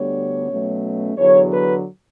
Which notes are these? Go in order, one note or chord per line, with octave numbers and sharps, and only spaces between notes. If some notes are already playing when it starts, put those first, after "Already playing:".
Already playing: D2 D3 G3 B3 D4 C#5
B2 F#3 A3 C#4
E2 D3 F#3 C#5
B4